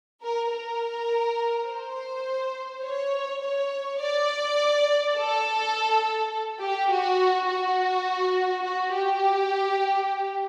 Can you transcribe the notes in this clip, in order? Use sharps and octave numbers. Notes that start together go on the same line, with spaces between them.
A#4
A#4
C5
C#5
C#5
D5
A4
G4
F#4
F#4
F#4
G4